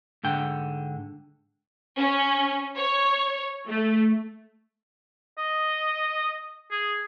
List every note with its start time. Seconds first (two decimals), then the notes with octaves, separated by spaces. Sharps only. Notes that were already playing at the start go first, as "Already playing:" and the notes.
0.23 G#2 D3 G5
1.97 C#4
2.77 C#5
3.69 A3
5.38 D#5
6.71 G#4